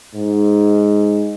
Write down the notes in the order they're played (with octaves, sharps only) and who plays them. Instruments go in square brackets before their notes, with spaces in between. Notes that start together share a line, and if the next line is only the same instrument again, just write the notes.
[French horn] G#2